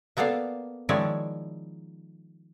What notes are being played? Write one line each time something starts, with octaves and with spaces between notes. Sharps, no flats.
A#3 B3 A4 D5 F5
D#3 F3 G#3 E4 C#5 D5